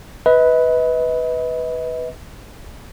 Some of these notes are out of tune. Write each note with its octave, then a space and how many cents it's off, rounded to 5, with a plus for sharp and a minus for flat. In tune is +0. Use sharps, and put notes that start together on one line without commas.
B4 +0 D#5 +40